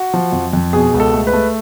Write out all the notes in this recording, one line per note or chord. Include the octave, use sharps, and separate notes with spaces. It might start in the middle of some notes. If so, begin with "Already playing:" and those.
Already playing: F#4
F3
F2
F2
B2 G#4
C#2
A4
A3
B4
A3